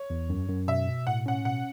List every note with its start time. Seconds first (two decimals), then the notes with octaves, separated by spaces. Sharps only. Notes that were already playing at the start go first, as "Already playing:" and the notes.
Already playing: C#5
0.10 E2
0.30 F#2
0.49 F#2
0.68 B2 E5
0.88 B2
1.07 A2 F#5
1.26 C#4 F#5
1.45 B2 F#5